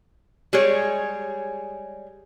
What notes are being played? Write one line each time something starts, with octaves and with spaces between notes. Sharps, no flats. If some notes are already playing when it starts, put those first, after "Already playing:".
G3 G#3 G#4 C#5